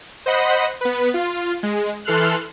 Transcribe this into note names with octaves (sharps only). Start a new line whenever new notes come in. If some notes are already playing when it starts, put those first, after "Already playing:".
C5 D#5 F#5 B5
B3 B4
F4
G#3
E3 A4 C6 F6 F#6